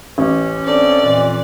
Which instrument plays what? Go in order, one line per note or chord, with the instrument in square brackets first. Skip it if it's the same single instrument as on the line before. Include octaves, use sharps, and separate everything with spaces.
[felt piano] A1 [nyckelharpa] C#4
[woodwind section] C4 D4 A4 [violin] D5
[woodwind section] F2 A#2 E3